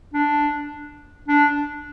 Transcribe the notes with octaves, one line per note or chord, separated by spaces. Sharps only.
D4
D4